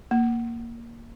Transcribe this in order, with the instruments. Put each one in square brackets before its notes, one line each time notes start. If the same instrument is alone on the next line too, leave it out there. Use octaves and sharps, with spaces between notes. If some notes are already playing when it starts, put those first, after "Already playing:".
[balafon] A#3